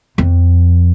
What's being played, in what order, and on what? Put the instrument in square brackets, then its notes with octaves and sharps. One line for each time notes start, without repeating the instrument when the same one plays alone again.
[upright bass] F2